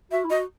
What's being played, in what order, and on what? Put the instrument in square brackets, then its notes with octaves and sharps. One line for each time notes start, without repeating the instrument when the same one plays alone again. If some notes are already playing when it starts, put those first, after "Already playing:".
[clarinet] F#4 [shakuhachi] E5
[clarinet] E4
[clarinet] F#4 [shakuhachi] D#5